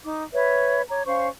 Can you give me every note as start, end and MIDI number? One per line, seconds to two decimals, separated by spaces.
0.04 0.24 63
0.04 0.24 86
0.34 0.81 71
0.34 0.81 73
0.34 0.81 76
0.34 0.81 83
0.89 1.03 73
0.89 1.03 82
0.89 1.03 86
1.07 1.27 61
1.07 1.27 72
1.07 1.27 77
1.07 1.27 85